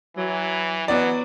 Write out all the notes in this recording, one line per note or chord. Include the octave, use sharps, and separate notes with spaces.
E3 F#3
E3 F#3 B3 D5